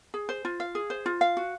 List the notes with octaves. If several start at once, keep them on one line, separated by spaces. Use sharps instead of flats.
G#4
C5
F4
F5
G#4
C5
F4
F5
F#4